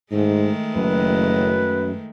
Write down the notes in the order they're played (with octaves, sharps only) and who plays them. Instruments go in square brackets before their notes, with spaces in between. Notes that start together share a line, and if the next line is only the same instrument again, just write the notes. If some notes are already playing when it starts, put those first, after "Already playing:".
[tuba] G#2 [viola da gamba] D#3 G#3 A3
[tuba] F#1 [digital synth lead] F#2 [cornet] B4